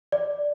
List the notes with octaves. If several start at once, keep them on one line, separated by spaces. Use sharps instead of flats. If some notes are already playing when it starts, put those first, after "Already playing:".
D5